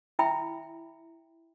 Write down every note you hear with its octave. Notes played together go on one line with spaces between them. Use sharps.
E4 E5 G5 B5